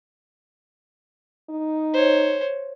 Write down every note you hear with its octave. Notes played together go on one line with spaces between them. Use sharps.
D#4
C5 C#5